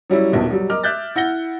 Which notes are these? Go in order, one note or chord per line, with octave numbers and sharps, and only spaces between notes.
F#3 G3 C#4 E4
D#1 A#1 D#2 B2
F#3 G3
A#4 D#5 D6 F6
E5 D6 F#6 G6 A6
E4 F#5 A#6 G7